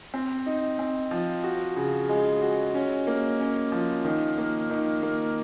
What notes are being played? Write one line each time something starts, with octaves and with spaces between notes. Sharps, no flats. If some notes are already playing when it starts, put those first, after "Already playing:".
C4
D#4
C4
F3
F#4
C#3
G#3
F#4
C#4
A#3
C#4
F3
D#3
A#3
D#3
A#3